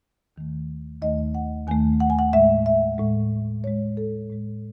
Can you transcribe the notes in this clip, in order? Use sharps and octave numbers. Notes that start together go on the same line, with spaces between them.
D#2 D#3 A3
D#2 D#3 A3 D#5
F#5
D#2 D#3 A3 G#5
F#5
G#5
F#5
A2 G#3 E5
E5
A2 G#3
A2 G#3 C#5
A4
A2 G#3